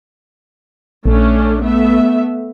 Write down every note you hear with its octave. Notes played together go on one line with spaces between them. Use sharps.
A#1 A3 C#4 D4
A3 B3 E5